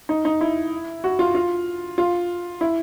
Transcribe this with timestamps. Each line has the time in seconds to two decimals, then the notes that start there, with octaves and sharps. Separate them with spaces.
0.09 D#4
0.25 D#4
0.41 E4
1.04 F#4
1.19 F4
1.35 F4
1.98 F4
2.61 E4